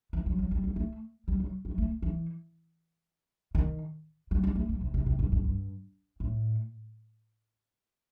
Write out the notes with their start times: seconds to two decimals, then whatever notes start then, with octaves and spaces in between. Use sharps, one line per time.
0.13 E3
0.26 F#3
0.39 F#3
0.51 G3
0.64 G3
0.76 A3
1.28 G3
1.40 F#3
1.65 F#3
1.78 A3
2.02 E3
3.55 D#3
4.31 G3
4.43 G3
4.55 A3
4.69 G3
4.81 C3
4.94 C3
5.06 C3
5.19 G2
5.32 G2
5.44 G2
6.20 A2